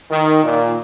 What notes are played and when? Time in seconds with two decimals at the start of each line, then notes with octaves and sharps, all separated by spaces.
0.10 D#3
0.44 A#2